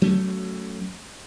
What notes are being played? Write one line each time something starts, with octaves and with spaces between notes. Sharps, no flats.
F#3 A3 C#4